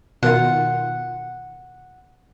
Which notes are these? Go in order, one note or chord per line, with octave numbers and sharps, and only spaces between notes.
B2 D#3 F4 F#5